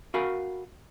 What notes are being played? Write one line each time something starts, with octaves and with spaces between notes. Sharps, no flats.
F#4 A#4 F5 G#5 B5